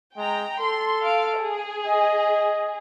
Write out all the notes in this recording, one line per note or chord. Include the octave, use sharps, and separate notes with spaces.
G#3 G5 A#5
A4 C6
F5 D7
G#4
D#5